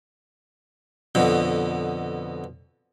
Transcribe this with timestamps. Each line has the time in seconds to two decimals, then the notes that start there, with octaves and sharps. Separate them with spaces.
1.15 F2 B2 D3